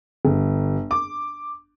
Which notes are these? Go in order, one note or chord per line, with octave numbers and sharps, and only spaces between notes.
G1
D6